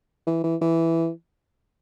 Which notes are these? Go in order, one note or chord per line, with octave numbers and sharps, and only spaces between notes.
E3
E3
E3